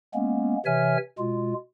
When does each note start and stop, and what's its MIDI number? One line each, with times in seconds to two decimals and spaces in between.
0.14 0.57 56
0.14 0.57 58
0.14 0.57 59
0.14 0.57 61
0.66 0.97 48
0.66 0.97 52
0.66 0.97 73
0.66 0.97 76
0.66 0.97 80
0.66 0.97 89
1.18 1.54 47
1.18 1.54 56
1.18 1.54 65